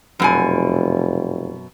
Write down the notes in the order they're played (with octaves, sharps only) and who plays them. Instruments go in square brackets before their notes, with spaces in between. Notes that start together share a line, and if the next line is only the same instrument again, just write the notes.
[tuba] F1 [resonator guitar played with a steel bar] F#2 B2 G#5